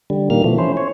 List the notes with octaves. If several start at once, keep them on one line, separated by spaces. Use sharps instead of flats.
D3 G3
A#2 D#3 G3 A#3 F6
B2 E3 F3 A3
C#4 E4 C5
C#5